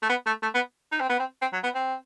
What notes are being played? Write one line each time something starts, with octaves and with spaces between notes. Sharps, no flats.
A3
B3
A3
A3
B3
D#4
C4
B3
C4
C4
F#3
B3
C4